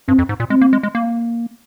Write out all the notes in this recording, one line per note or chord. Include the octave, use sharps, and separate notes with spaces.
G2 C4
F2
G#2
A#2
G#3 C4
A#3
G#3
G#3
A#3